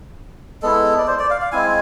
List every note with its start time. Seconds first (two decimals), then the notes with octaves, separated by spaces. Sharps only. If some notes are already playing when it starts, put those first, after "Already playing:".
0.62 G#3 B3 E4 A4
0.98 D5
1.07 C5
1.19 D5
1.30 F5
1.42 F5
1.52 G#3 C4 E4 G#5